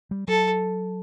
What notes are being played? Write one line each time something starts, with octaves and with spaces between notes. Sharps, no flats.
G3
F#3 A4